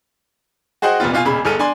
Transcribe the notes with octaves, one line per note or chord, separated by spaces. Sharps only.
F#4 G#4 C5 D#5 F#5 G5
F1 A#2 B3 F4
B2 F4 F5 G#5
E1 A#2 C#3 B5
G1 G#4 A4 F6 D#7
D4 G#5 C6